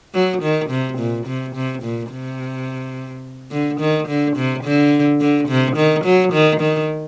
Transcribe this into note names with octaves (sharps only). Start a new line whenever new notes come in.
F#3
D#3
C3
A#2
C3
C3
A#2
C3
D3
D#3
D3
C3
D3
D3
C3
D#3
F#3
D#3
D#3